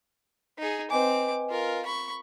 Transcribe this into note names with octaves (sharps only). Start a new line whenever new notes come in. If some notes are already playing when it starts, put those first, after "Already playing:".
D#4 G#4
C4 B4 D#5 G#5 D6
F4 A#4
B5 C#6